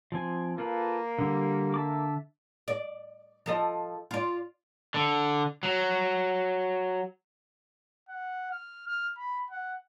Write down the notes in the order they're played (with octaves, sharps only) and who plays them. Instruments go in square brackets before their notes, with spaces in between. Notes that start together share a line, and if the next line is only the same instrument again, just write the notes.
[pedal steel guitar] F3 C4 G#5
[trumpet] A#3 [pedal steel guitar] F4 A4 B4
[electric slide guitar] D3 [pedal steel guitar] G3
[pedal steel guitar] E5 A5 D6
[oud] D5
F3 A4 D#5
F4 D5
[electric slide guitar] D3
F#3
[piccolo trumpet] F#5
F6
F6
B5
F#5